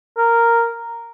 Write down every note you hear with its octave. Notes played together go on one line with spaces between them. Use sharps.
A#4